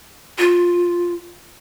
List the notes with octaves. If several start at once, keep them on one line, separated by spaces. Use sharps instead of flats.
F4